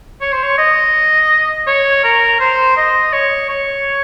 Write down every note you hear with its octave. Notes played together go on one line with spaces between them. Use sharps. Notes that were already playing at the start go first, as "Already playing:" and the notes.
C#5
C5
C#5
D#5
C#5
A#4
C5
D#5
C#5
C#5